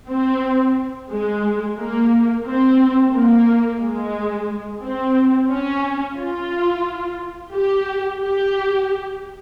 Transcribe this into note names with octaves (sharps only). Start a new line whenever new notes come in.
C4
G#3
A#3
C4
A#3
G#3
C4
C#4
F4
G4
G4